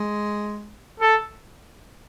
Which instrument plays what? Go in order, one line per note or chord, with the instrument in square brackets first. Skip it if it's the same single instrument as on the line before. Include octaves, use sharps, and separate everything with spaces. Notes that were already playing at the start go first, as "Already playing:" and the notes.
Already playing: [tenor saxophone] G#3
[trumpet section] A4